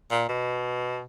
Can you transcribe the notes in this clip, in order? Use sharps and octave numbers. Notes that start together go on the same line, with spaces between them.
A#2
B2